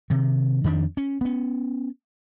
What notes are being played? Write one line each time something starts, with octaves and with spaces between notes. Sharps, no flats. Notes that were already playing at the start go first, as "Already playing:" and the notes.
C3 D#3
F2 D#3 F3 D4
C#4
B3 C#4